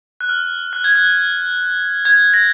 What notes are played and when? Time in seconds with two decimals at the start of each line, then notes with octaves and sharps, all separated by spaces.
0.21 F#6
0.29 F6
0.73 F#6
0.84 G#6
0.95 F#6
2.05 G#6
2.34 A#6